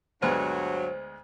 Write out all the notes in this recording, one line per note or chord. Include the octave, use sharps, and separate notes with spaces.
D2 G2 F#3 G#3 B3 C5